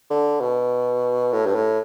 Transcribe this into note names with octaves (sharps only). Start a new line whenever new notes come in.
D3
B2
A2
G2
A2